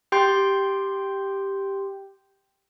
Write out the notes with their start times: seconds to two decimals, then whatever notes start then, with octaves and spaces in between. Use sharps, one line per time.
0.12 G4 G5 C6 G6